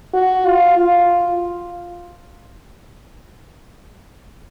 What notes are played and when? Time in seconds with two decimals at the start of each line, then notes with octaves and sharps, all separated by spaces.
0.14 F#4
0.46 F4
0.78 F4